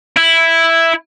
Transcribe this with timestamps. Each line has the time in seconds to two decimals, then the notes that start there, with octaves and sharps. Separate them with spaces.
0.16 E4